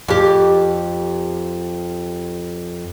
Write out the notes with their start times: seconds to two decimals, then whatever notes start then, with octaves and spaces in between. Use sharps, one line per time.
0.08 F2 G4